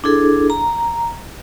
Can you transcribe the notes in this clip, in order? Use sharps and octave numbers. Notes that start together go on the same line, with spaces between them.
D4 E4 G#4 A4
A#5